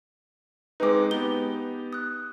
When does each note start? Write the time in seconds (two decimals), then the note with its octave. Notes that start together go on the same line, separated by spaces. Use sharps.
0.80 G#3 C4 D#4 B4 D6
1.11 B3 D#4 G4 G7
1.93 D#6 F#6